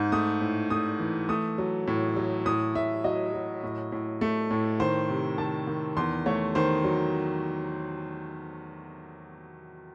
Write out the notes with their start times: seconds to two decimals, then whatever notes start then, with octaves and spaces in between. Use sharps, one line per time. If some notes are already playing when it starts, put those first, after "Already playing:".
Already playing: G#2
0.12 A3 D#6
0.41 A2
0.70 A3 D#6
1.00 E3
1.29 A3 D#6
1.58 F#3
1.87 A2
2.16 F#3
2.46 A2 D#6
2.75 A2 E5
3.04 F#3 D#5
3.33 F#3
3.63 A2
3.92 A2
4.21 A3
4.51 A2
4.80 D#3 C5
5.09 C3
5.38 D#3 A5
5.67 D#3
5.97 E2 C6
6.26 A3 C#5
6.55 D#3 C5
6.84 F#3